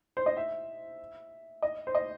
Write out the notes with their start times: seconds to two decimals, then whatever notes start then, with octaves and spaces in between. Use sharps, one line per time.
0.17 C5
0.26 D#5
0.37 E5
1.62 D#5
1.87 C5
1.95 D#5